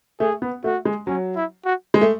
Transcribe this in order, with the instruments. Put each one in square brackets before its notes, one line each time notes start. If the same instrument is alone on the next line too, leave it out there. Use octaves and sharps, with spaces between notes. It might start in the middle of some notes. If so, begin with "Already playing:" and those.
[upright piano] A3 [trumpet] G#4
[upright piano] B3
[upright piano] A3 [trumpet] F#4
[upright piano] G#3
[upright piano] F#3 [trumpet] C#4
[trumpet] E4
F#4
[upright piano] G#3
A3